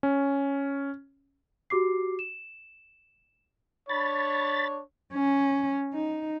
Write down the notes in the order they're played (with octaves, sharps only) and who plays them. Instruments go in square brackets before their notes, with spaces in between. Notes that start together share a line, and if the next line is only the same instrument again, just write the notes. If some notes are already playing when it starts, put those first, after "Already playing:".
[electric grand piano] C#4
[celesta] F#4 G4 D6 C7
E7
[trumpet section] D4 C#5 [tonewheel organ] B5 A6
[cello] C#4
D#4